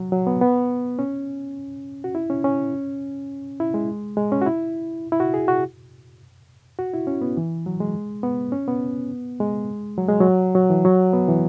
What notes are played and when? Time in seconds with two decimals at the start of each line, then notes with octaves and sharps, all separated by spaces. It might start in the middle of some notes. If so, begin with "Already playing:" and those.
Already playing: F#3
0.12 F#3
0.27 B3
0.41 B3
0.99 C#4
2.04 F#4
2.15 E4
2.30 C#4
2.44 C#4
3.60 E4
3.74 G#3
4.17 G#3
4.32 C#4
4.42 F#4
4.46 E4
5.12 E4
5.20 F#4
5.34 G#4
5.48 F#4
6.79 F#4
6.94 E4
7.07 C#4
7.22 B3
7.37 E3
7.66 F#3
7.80 G#3
8.23 B3
8.52 C#4
8.68 B3
9.40 G#3
9.98 F#3
10.09 G#3
10.20 F#3
10.55 F#3
10.70 E3
10.85 F#3
11.13 B3
11.28 E3